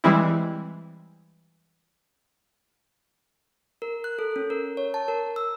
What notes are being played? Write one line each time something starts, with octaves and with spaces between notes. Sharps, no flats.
E3 G3 G#3 C4 E4
A#4
F#6
A4
C#4
A#4
C#5
A5
A#4
E6